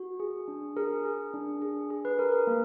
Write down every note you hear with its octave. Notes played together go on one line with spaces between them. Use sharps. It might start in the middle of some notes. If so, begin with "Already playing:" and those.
Already playing: F#4
G#4
D4
G#4 A#4
G#4
D4
G#4
G#4
B4
G#4 A#4
A#4
A#3